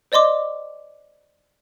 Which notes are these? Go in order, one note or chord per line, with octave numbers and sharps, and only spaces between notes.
C5 D5 D#5 C6 D6